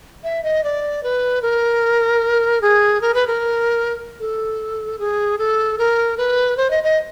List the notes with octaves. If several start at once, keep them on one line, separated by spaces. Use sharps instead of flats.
E5
D#5
D5
B4
A#4
G#4
A#4
B4
A#4
A4
G#4
A4
A#4
B4
C5
D#5
D#5